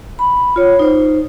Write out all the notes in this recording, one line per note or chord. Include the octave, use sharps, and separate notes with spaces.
B5
F4 C#5
D#4 C5